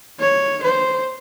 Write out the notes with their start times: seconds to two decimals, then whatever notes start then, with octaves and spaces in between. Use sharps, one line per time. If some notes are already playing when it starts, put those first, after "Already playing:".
0.20 C#5
0.63 C5